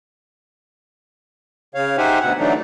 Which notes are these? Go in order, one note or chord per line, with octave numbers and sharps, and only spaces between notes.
C#3 C#5 F5
D#4 G4 C5 E5 F#5 G#5
D2 B2 F#5
D3 E3 F#3 A3 D4 D#4